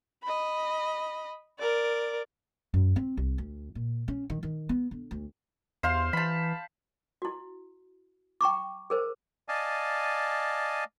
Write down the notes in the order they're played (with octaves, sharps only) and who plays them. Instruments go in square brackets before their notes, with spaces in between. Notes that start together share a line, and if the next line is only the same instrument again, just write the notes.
[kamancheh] D#5 B5
A#4 D5
[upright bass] F#2
C4
C2
D2
A#2
C#4
D#3
D#3
B3
D3
D2
[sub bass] E2 [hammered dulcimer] C5 F5 C6
[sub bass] E3 [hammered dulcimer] A5 B5
[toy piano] E4 F#4
G5 A#5 C#6 D6
G#4 A#4 C5
[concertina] D5 D#5 F5 G#5 A5